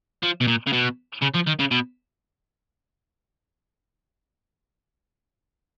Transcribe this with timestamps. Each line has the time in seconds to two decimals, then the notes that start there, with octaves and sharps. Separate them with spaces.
0.23 F3
0.41 B2
0.47 A#2
0.67 C#3
0.72 B2
1.22 C#3
1.35 F3
1.47 D#3
1.60 C#3
1.71 B2